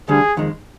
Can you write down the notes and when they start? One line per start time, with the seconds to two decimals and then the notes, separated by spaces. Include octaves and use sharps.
0.08 D2 D3 G3 G#4
0.37 F2 D#3 G#3